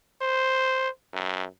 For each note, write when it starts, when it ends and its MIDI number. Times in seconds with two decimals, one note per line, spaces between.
0.21 0.89 72
1.13 1.45 42